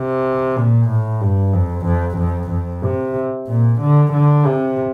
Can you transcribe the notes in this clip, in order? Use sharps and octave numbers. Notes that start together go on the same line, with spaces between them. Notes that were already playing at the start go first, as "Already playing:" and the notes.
Already playing: C3
A#2
A2
G2
F2
F2
F2
F2
C3
A#2
D3
D3
C3